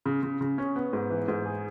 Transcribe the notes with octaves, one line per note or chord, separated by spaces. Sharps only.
C#3
C#3
C#3
C#4
B3
G#2
E3
G#2
G#4